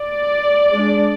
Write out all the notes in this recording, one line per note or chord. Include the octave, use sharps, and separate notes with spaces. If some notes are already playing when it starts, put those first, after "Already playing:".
Already playing: D5
G#3 D4